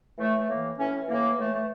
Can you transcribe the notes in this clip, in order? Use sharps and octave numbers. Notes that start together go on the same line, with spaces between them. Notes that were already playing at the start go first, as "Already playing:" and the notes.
A2 E3 A3
A3
A2 E3 A#3
A2 E3 C#4
A2 E3 A#3
A2 E3 A3
A3